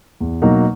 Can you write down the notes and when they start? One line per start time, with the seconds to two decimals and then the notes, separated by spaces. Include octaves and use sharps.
0.21 E2
0.42 B2 F#3 A#3 D#4